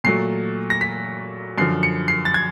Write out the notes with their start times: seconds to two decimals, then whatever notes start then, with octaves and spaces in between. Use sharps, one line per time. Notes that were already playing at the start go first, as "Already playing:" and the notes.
0.04 A#2 F#3 A3 C7
0.70 A#6
0.81 B6
1.58 F#2 D3 F3 C7
1.83 C#7
2.08 C7
2.25 A6
2.34 G#6